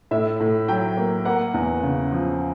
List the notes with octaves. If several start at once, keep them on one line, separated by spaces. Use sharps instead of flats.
A2 E5
A2
F#3 G5
A#3
A#3 F#5
E2
C#3
F3